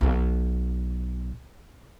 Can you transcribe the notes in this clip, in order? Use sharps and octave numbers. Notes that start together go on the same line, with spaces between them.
B1 B2